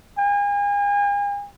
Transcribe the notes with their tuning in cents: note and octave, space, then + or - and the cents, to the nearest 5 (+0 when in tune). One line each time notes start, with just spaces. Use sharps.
G#5 -40